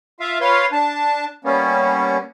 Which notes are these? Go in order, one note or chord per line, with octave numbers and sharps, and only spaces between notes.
F4 E5 F5
F4 B4 C#5 F5 C6
D4 A5
G3 A#3 B3 C#4